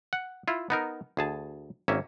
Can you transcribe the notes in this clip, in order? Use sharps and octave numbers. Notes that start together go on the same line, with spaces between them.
F#5
E4 F4
B3 D#4 A#4
D2 G#4 A5
G#1 A#3 C#4 E5